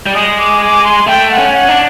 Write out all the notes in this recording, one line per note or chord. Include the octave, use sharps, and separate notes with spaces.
G3
G#3 D#6
D6
D6
C6
A3 G5
F#5
C#4
F#5
D4